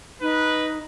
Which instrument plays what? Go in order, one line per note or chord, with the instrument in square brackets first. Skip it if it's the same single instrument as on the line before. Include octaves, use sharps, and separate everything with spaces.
[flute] D#4 [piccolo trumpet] B4